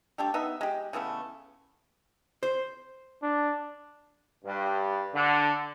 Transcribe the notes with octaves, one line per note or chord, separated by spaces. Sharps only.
G3 A3 D4 G4
B3 D#4 E5
G#3 G4
C#3 E3 A3 B3
C5
D4
G2
D3